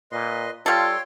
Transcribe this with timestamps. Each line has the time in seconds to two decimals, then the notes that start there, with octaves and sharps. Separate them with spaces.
0.12 A#2 B4 D#5 C6
0.66 G3 F4 A4 C#5 G5 C6